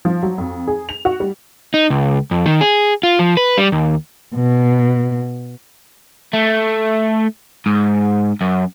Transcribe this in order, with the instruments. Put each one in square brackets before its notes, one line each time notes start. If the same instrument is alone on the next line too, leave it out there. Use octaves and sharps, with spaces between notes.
[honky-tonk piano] F3
F#3
F2
G#4
F7
F#4
G3
[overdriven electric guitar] D#4
C#2
F2
D#3
G#4
F4
F3
B4
G3
D#2
[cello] B2
[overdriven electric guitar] A3
G#2
F#2